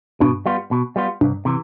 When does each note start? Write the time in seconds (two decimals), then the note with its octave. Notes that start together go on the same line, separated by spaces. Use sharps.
0.20 G2 B2
0.46 G3 B3 F4
0.71 B2
0.96 G3 B3 F4
1.21 C2 G2
1.45 C3 E3